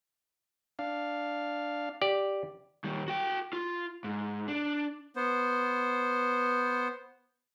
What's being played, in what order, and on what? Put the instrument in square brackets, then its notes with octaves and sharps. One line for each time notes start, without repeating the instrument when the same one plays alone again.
[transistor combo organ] D4 F5
[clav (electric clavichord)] G4 D5
[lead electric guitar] D#2 G3
F#4 G5
F4
G#2
D4
[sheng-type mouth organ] B3 C5